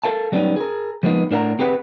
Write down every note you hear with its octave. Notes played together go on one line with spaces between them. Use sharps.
A4 A#4 F5 A5
F#3 G3 A#3 B3 C#4 D#4
G#4 A#4
F3 G#3 A#3 B3 D#4
A2 D4 A#4 F5 F#5 A#5
C4 G4 G#4 B4 F#5